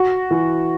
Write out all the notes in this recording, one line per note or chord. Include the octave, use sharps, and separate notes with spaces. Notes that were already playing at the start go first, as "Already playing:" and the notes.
Already playing: F#4
E3